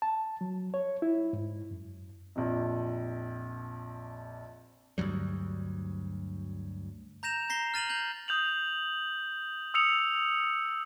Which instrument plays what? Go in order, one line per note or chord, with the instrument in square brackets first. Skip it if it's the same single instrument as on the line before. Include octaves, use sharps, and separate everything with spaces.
[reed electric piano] A5
F#3
C#5
E4
G#2
F#2
[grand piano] A#1 F2
[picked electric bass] D2 G2 F#3 G3
[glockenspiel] A#5 G6 A#6 E7 F7
A#5 A#6 C7 G7
F6 A6 D#7 F7 F#7
G6 F7 F#7
[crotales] D#6 G6 F7 F#7
D#6 E6 C#7 F7